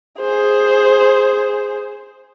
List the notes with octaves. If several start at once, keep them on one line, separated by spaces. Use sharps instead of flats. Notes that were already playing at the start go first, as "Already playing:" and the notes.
G#4 C5